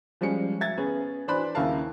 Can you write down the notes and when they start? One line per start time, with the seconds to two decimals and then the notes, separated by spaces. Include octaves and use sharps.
0.21 F3 G3 G#3 C#4 C#7
0.61 E5 G#6 A6
0.78 B3 C#4 G#4
1.28 E3 D4 C5 B5 F#6
1.55 D#2 C#3 A#3 E4 F5 A5